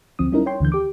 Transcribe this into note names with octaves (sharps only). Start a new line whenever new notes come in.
D2 F3 C4 D#6
G3 C#4 D#4 E4 A#4
C#5 G5 C6
D2 D3 E3 G6
G4 D6